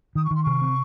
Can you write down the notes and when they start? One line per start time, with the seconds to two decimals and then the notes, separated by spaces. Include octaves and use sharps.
0.15 D#3 D#6
0.24 C#6
0.31 D#3 C6
0.43 C3 C#6
0.61 C4